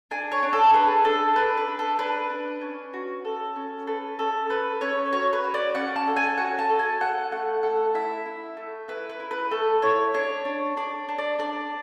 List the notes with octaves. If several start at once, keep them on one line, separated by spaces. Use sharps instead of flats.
D4 G#5
C#5
D4
A4
G#4 B4
D4 A4
D4 B4
B4
D4
A4
D4 B4
D4
C#4
F#4
A4
C#4
A4 B4
C#4 A4
A4 B4
C#4 C#5
F#4 C#5
B4
F#4
D5
C#4 F#5
A5
A4
G#5
F#4 F#5
A5
A4
G#5
A4 F#5
A3 F#5
A4 F#5
E4 E5
E4
A3
E4 B4
B4
E4
B4
A3 A4
E4 C#5
D4 C#5
D4
D4 D5
D4
D5
D4 D5